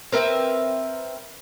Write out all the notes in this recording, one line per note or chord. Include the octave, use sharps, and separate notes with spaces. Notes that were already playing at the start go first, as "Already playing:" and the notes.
C4 A#4 B4 E5